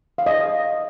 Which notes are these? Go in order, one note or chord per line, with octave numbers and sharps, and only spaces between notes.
F5
D#5